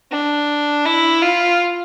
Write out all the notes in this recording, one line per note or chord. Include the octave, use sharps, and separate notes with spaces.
D4
E4
F4